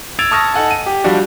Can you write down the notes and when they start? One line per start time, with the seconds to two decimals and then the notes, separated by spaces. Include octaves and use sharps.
0.19 E6 G#6 A6 D7 F7
0.31 A5 C#6 D#6 F6 G#6 A#6
0.53 D#4 A4 F#5 G#5 A5
0.71 D#7
0.86 G4
1.04 F3 G3 D4 F#4